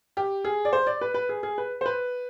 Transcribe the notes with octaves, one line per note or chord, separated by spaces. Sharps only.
G4
G#4
D5
C5
D5
B4
B4
G#4
G#4
B4
C5
B4